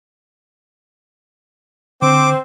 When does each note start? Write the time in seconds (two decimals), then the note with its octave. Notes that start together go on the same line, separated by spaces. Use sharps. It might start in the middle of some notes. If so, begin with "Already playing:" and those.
2.02 D3 C4 D6